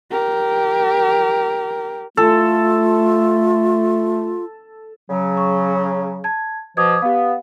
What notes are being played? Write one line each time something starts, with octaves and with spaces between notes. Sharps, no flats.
G4 A#4
A3 F4 A4
C#3 F#3
C#6
A5 G#6
B2 F3 D6 D#6 G#6
B3 G4 F5